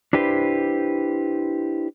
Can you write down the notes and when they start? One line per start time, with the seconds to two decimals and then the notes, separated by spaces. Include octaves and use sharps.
0.13 D4 E4 G4 B4 C5